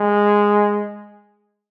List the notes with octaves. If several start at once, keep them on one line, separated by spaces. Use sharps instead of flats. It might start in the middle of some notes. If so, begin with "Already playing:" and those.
Already playing: G#3